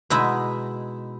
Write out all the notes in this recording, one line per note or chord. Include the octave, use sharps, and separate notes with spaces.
B2 G#3 D#4 E4 E5